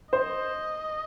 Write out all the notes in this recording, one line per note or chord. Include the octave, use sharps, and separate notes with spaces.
C5 D#5